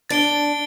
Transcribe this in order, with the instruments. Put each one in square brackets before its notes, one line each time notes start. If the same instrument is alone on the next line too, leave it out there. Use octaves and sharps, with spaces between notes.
[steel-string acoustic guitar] D4 [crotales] A6 D7 G7